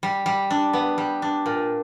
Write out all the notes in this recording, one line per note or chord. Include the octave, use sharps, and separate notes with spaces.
G3
G3
D4
B3
G3
D4
A#2